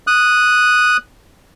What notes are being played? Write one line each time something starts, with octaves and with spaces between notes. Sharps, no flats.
D#6 F#6